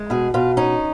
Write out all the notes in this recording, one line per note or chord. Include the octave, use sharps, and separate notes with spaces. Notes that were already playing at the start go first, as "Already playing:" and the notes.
Already playing: G#3
B2 G#4
B2 F4
C#4 D#4